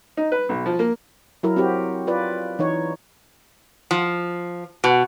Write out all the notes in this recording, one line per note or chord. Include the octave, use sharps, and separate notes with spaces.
D#4
B4
B1
F3
A#3
F#3 E4 A#4
C4 F#4 G4
F4 B4 D5
E3 D#4 C#5
F3
B2